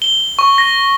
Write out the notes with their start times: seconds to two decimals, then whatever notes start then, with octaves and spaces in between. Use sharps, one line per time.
0.02 G7
0.39 C#6
0.58 A#6